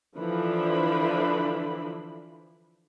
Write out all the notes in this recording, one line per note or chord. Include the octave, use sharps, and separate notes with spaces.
D3 E3 F3 D4 B5